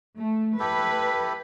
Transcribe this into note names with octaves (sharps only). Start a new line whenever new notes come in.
A3
E4 G4 A4 B4